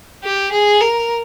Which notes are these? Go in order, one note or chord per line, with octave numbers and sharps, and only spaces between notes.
G4
G#4
A#4